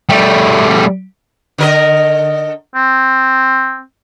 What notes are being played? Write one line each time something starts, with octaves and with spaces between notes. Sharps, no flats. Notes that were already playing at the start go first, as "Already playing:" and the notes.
G3 A3
D3 A#4 D#5
C4